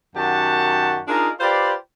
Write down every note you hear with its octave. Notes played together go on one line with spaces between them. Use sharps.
F#2 D#3 F#4 G4 F#5 A5
D4 D#4 F4 G#4 A#4
F4 G4 B4 C5 D5